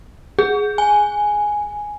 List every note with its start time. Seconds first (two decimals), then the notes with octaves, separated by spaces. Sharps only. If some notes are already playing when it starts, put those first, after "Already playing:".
0.39 G#4
0.78 G#5